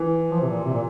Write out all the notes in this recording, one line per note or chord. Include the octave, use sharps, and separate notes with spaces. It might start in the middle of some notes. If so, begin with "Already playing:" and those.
Already playing: E3
F3
C3
A#2
C3
A#2